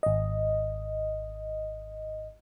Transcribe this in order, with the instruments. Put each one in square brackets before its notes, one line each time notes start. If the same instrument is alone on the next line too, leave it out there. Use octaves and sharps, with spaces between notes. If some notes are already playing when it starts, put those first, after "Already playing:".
[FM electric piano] G#1 D#5